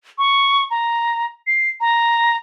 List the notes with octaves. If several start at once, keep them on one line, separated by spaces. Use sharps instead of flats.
C#6
A#5
C7
A#5